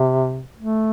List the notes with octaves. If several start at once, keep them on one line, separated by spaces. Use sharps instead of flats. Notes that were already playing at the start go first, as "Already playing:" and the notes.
Already playing: C3
A3